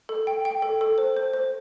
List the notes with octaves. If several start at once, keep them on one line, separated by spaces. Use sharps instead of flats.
A4
G5
G5
A4
A4
C5
C5
C5